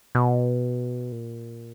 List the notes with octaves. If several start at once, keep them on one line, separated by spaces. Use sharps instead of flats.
B2
A#2